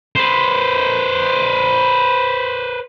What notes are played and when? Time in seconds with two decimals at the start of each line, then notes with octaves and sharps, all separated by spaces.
0.16 B4 C5